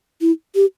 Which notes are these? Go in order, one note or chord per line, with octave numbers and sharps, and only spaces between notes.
E4
G4